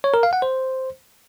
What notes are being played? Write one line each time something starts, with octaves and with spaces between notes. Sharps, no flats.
C#5
A#4
F5
F#5
C5